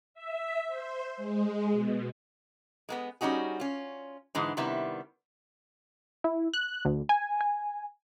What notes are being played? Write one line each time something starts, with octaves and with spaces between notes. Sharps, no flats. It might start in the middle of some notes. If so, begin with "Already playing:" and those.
E5
C5
G#3
B2
G#3 A#3 B3
G3 C#4 D#4 F#4 G#4
C#4 F4
G#2 D3 E3 G#3
C3 D#3 G3 B3 E4
E4
F#6
D2
G#5
G#5